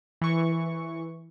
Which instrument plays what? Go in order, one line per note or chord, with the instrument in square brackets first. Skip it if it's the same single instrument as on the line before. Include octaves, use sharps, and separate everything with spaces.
[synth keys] E3 C#6